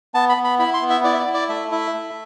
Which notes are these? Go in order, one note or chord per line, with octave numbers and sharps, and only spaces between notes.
B3 A5
B5
B3
B5
E4 B5
C6
B3
E5
E4 D5
E5
D5
E4
D5
A3 E5
E4 E5
A3